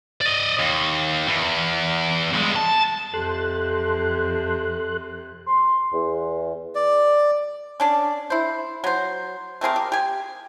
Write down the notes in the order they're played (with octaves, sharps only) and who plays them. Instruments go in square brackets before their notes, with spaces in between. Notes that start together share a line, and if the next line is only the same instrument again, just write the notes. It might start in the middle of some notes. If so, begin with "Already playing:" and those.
[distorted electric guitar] D5 D#5
D#2
E2
G2 G#3
A5
[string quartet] F2 C3 [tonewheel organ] A4 C6 F#6
[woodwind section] C6
E2
[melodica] D5
[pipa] C#4 D4 D5
E4 C5
F#3 C5
A3 C4 G#4 A#4
G4
G4 G#5